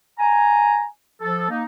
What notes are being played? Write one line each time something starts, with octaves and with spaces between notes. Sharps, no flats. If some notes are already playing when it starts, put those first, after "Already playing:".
G#5 A#5
F3 A4
A#3 D#4